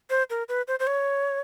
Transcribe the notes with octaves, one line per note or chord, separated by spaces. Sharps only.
C5
A#4
B4
C5
C5
C#5